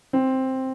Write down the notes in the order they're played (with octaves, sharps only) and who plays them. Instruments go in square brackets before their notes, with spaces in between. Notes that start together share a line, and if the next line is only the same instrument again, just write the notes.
[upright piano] C4